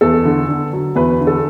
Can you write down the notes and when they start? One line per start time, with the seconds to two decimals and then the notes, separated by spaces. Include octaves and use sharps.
0.01 E2 A4
0.25 D3
0.49 D3
0.73 F#3
0.95 E2 B4
1.20 D3
1.27 A4